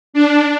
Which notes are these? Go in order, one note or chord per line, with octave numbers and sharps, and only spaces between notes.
D4